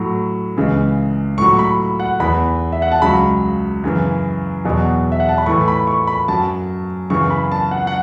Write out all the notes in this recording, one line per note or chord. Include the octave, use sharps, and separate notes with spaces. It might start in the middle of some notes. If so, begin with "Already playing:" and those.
Already playing: A2 F#3
C#2 C#3 E3
A2 F#3 C#6
B5
F#5
E2 E3 B5
E5
F#5
A5
C#2 C#3 F#3 B5
F#2 C#3 E3
E2 B2 F#3
E5
F#5
A5
B5
A2 E3 C#6
B5
C#6
B5
F#2 F#3 A5
F#2 C#3 E3 C#6
B5
A5
F#5
F#5